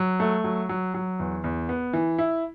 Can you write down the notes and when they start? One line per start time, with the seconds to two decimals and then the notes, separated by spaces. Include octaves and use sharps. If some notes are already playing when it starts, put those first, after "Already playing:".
Already playing: F#3
0.20 A3
0.44 F#3
0.69 F#3
0.94 F#3
1.19 E2
1.44 E2
1.69 B3
1.93 E3
2.18 E4